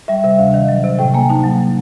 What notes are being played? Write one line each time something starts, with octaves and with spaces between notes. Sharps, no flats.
G3 E5
C3 E5
D2 F5
D#3
F#3
C3
A2 G5
A#3 G#5
D#4 A5
F#3